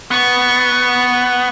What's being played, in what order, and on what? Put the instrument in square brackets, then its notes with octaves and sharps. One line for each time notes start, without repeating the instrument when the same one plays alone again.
[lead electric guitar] B3 [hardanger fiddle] C#6